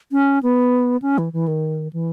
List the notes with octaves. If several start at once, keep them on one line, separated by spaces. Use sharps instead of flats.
C#4
B3
C#4
E3
E3
D#3
E3